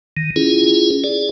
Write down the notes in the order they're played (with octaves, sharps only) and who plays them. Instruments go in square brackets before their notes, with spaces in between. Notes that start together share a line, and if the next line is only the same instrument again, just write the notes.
[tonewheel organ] D#3
C#4 E4 F4 G#4
G#4 D5